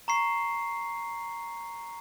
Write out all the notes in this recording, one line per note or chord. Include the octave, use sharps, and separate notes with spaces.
A#5 C#6 C7